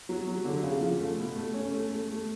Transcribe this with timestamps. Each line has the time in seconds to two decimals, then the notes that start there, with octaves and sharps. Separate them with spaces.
0.09 F#3
0.28 F#3
0.45 D3
0.63 C#3
0.81 F3
0.99 A3
1.18 B2
1.36 A3
1.54 C#4
1.72 A3
1.90 A3
2.08 A3